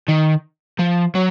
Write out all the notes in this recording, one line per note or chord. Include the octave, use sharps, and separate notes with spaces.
D#3
F3
F#3